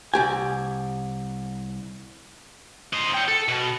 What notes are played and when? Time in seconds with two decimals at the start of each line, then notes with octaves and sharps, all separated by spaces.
0.14 C2 G4 G#5
2.93 C5 D#5
3.14 C#5 G5
3.28 A4
3.49 B2